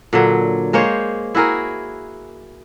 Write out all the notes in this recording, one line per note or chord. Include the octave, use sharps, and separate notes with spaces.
A#2 D3 F#3
G#3 A#3 C5 C#5
E4 F#4 G#4 A#4